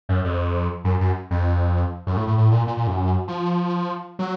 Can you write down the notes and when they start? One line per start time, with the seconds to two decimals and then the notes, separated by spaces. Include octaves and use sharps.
0.09 F#2
0.25 F2
0.84 F#2
1.00 F#2
1.31 F2
2.07 F#2
2.17 A2
2.27 A2
2.38 A2
2.52 A#2
2.67 A#2
2.77 A#2
2.87 F#2
3.28 F3
4.19 F#3